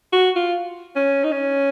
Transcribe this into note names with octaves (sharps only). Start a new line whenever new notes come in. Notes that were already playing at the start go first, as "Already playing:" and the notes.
F#4
F4
C#4
D#4
C#4